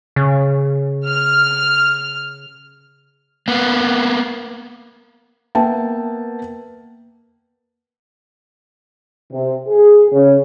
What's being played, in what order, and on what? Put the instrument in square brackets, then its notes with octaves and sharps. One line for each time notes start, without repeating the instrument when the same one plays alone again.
[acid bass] C#3
[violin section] F6
[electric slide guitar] A#3 B3
[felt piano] A#3 B3 E5 G5 A5
[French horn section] C3
G#4
C#3